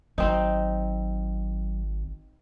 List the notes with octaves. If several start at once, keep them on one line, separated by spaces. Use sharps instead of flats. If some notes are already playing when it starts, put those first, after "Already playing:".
G#1 F#3 C4 D#4